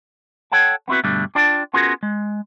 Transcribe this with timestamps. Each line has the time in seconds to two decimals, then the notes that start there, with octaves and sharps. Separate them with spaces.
0.52 A4 C#5 F#5 G5 A5
0.88 B3 C4 E4 F#4 B4
1.04 G2 B2 D3 G3 A3
1.35 D4 F4 D5 G5 A5
1.74 B3 C#4 F4 F#4 G#4 A#4
2.03 G#3